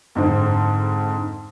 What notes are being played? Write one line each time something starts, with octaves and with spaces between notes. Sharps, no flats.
F2 G#2 D3 C4